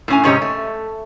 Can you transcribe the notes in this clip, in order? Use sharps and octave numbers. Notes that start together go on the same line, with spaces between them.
A2 C#4 G#5
G#2 C3 C#4 G4 C#5 D#5
A3